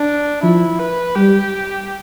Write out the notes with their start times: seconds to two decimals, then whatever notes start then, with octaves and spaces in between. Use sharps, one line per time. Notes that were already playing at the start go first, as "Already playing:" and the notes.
Already playing: D4
0.43 F3 E4
0.79 B4
1.16 G3 G4